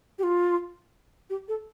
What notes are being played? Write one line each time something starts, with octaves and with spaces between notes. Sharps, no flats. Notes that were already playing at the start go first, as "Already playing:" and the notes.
G4
F4
G4
A4